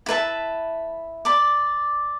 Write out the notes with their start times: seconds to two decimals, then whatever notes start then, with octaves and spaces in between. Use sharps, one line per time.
0.06 E4 B4 E5 A5
1.25 D5 B5 D6